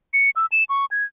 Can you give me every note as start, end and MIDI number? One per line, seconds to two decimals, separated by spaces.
0.13 0.30 97
0.36 0.46 88
0.52 0.64 100
0.69 0.85 85
0.91 1.04 92